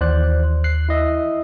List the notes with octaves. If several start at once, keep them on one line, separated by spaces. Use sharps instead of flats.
D#2 E3 C5 D5 F#6
F#6 C7
E4 D#5 E5